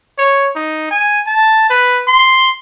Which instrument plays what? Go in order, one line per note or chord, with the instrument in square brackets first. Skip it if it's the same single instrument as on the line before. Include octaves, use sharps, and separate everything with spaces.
[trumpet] C#5
D#4
G#5
A5
B4
C6